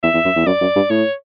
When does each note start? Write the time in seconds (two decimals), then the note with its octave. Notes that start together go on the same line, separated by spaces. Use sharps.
0.03 E2 E5
0.14 E2
0.25 F#2
0.36 E2
0.46 F#2 D5
0.61 F#2
0.76 G2
0.90 A2 C#5